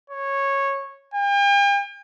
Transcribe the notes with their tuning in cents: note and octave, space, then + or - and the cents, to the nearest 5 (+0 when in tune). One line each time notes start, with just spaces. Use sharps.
C#5 -10
G5 +45